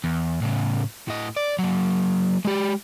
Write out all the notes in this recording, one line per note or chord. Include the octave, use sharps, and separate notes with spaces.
E2
A2 C#3
A2 D#5
D5
F#3 A#3
G#3 G4